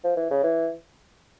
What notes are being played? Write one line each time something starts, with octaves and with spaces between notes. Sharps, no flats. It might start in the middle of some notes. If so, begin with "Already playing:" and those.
F3
E3
C#3
E3